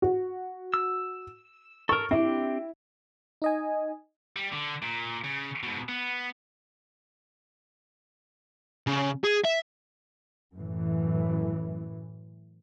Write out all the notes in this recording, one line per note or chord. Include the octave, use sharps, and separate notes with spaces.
F#4
E6
A4 A#4 C#6
C4 D4 E4 G4
D#4 D#5 G#5
G3
D3
A#2
C#3
G#2 B2
B3
C#3
G#4
E5
F#2 A2 E3